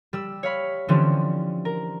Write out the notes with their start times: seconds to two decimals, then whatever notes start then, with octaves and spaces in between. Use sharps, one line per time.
0.13 G3 E6
0.43 C#5 F5 B5
0.88 D3 E3 F3 G3 C4 C#4
1.65 A#4